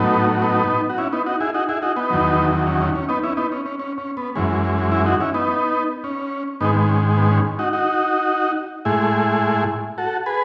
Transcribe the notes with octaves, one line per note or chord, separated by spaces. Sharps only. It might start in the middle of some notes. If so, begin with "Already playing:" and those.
Already playing: A2 F#3 B3 D#4
B3 D#4
F#4
C#4 E4
B3 D#4
D#4 F#4
E4 G#4
D#4 F#4
E4 G#4
D#4 F#4
B3 D#4
E2 D#3 F#3
C#4
C#4
C#4
B3 D#4
C#4 E4
B3 D#4
C#4
C#4
C#4
C#4
B3
F#2 E3 G#3 C#4
C#4
C#4
C#4
C#4 E4
D#4 F#4
C#4 E4
B3 D#4
C#4
G#2 D#3 G#3 B3 D#4
B3
C#4
B3
C#4
D#4 F#4
D#4 F#4
A2 G#3 E4 G#4
F#4 A4
G#4 B4